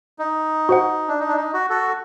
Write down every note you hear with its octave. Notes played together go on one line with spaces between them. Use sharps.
D#4
F#4 C5 F#5
D4
D#4
D4
D#4
F#4
F#4 A4